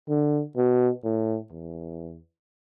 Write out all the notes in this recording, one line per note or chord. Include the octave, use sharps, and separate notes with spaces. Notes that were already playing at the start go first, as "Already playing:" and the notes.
D3
B2
A2
E2